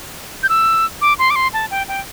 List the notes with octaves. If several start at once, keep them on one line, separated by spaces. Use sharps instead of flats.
G6
E6
D6
C6
D6
C6
A5
G5
G5